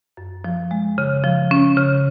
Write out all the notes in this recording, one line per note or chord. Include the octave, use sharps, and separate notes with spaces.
F#2
F3
G#3
C#3
F3
C#4
C#3